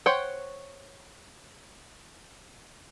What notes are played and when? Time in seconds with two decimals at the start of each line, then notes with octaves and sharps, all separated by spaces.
0.06 C5 C#5 F#5 G5